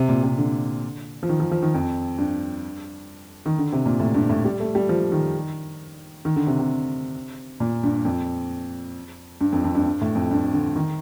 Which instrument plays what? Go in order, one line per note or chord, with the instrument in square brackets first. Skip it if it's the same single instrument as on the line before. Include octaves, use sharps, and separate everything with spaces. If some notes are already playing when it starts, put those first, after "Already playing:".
Already playing: [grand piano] C3
A#2
C3
D3
F3
D#3
F3
F3
D#3
F2
G2
D#3
D3
C3
A#2
A2
G2
A2
G3
A3
G3
F3
D#3
D#3
D3
C3
C3
A#2
G2
F2
G2
F2
F2
G2
G2
A2
F2
G2
D3
D#3